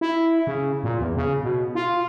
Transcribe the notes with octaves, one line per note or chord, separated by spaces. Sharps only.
E4
C#3
A#2
E2
C#3
B2
F4